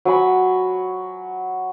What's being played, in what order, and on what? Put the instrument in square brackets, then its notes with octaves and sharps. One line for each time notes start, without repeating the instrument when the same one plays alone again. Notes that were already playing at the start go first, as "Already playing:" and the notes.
[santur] F#3 G#5 B5